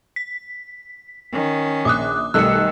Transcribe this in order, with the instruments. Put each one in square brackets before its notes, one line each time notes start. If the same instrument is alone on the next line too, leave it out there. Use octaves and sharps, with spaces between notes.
[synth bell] B6
[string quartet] D#3 C#4
[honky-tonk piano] A#1 [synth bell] D6 D#6 F#6
[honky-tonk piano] B1 G3 A3 [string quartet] D#3 [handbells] E6 [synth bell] F#6 C#7